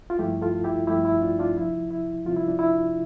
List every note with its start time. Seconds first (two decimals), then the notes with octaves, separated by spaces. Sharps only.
0.10 F4
0.18 G2 F3 A3 E4 G4
0.42 F4 A4
0.64 E4 G4
0.87 G2 F3 A3 E4 G4
1.05 E4
1.22 D4 F4
1.39 D4 F4
1.56 C2 C3 F3 E4
1.91 E4
2.25 C2 C3 F3 F4
2.36 E4
2.48 D4
2.59 E4